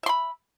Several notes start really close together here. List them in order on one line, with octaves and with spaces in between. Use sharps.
E5 C6 B5